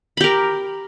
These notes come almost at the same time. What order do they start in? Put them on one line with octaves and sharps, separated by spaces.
B5 G4 A#4